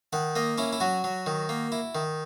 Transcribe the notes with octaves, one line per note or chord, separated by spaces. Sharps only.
D#3 F#5
A#3 D#5
C#4 E4
E4
F#3 F#4
F#3
D#3
A#3
E4
D#3